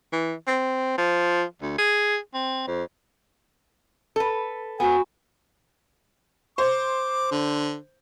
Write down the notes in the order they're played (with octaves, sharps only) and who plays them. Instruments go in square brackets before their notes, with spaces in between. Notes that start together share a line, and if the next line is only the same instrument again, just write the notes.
[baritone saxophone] E3
C4
F3
D2
G#4
C4
F2
[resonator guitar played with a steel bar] A4 B4
[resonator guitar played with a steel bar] B3 [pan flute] F#4 [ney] G#5
[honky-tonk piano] C5 [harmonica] D6
[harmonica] D3